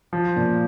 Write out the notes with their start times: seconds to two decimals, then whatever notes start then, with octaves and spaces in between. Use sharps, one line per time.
0.13 F3
0.36 A#2